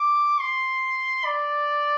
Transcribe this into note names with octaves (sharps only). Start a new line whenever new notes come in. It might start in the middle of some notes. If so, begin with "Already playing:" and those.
Already playing: D6
C6
D5